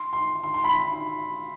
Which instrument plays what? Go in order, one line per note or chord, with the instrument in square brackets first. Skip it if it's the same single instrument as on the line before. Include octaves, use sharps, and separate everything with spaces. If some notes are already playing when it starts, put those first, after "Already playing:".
Already playing: [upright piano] C6
C6
C6
C6
B5